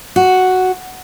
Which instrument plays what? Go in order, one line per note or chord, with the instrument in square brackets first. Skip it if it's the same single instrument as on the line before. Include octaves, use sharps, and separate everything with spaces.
[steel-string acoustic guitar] F#4